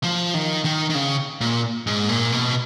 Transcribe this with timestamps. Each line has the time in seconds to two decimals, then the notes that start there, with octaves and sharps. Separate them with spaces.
0.03 F3
0.34 D#3
0.65 D#3
0.90 D#3
0.95 C#3
1.41 A#2
1.87 G#2
2.09 A#2
2.32 B2